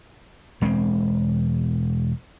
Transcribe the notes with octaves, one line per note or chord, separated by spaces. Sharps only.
E1 G#3 A#3 C4